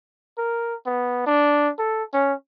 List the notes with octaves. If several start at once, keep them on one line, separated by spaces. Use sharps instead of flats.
A#4
B3
D4
A4
C#4